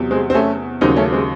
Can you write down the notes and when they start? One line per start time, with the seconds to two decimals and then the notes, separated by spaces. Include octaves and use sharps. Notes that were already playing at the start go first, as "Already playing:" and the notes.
Already playing: E2 C3 F#3
0.11 G#3 C4
0.30 C4
0.34 A3 C#4
0.81 D#2 C#3 F#3 C4 D#4
0.96 A3 C#4
1.12 G#3 C4